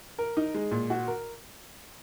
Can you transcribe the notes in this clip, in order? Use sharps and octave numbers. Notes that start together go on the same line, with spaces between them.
A#4
D#4
G#3
A#2
F#4
A#4